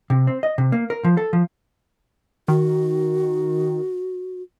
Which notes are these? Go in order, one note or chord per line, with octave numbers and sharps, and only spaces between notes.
C3
C4
D#5
C3
A#3
A#4
F3
A4
F3
D#3 F#4